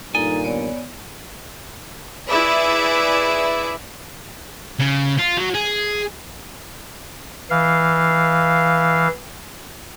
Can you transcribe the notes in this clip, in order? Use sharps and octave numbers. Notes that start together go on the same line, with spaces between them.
G2 A#2 D#3 D#4 A4 G#5 A#5
B3 C#5 D5
E4 G#4 B4 D5 E5
C#3
F4
F#3
G#4
E3 F5